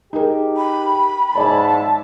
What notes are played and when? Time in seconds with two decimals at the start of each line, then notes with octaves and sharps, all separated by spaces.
0.13 D#4 G4 G#4 A#4
0.57 B5
1.35 G#2 C#5 D5 E5 G#5 A5